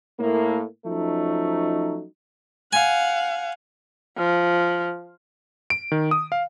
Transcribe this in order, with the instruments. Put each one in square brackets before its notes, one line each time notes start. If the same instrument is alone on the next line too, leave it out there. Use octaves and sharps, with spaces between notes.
[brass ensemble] A2 A#3
F3 F#3 A3 C#4 D#4
[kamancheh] F5 F#5 [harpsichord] G#5
[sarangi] F3
[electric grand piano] D7
D#3
D#6
F5